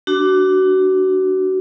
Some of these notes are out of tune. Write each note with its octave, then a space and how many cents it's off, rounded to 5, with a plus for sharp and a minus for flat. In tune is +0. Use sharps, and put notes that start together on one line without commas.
D4 +0 F#4 +25